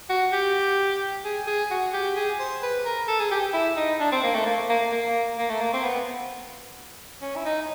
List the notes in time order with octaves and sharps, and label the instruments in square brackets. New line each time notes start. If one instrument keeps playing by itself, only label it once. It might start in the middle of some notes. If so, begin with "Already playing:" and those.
[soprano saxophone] F#4
G4
G#4
G#4
F#4
G4
G#4
C5
B4
A#4
A4
G#4
G4
E4
D#4
D4
C4
A#3
A3
A#3
A#3
A#3
A#3
A3
A#3
C4
B3
C#4
E4
D#4